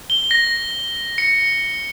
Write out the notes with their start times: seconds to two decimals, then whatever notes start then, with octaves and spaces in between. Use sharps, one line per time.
0.10 G7
0.31 A#6
1.18 C#7